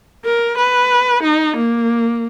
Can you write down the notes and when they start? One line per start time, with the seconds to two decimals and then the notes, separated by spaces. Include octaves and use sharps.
0.25 A#4
0.57 B4
1.23 D#4
1.56 A#3